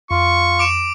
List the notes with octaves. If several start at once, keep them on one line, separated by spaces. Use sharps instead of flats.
F2 F4 C#6
D6 D7 E7